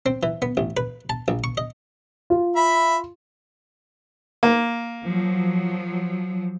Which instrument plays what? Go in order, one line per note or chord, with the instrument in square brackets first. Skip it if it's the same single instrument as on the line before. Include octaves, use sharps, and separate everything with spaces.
[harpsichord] C4
E3
B3
A1
B4
A5
A#1
C#6
D#5
[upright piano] F4
[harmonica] E5 B5
[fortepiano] A#3
[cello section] F3 F#3